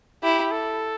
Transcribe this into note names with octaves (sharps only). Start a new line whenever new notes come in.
E4 G4
A4